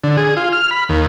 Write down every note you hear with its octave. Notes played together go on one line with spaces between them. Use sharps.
D3
G#4
F4
F6
B5
D#2